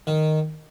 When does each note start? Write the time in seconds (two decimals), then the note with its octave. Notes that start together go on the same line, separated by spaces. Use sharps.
0.07 D#3